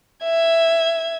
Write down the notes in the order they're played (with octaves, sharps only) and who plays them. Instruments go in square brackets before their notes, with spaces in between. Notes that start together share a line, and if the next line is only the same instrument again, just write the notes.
[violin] E5 G#6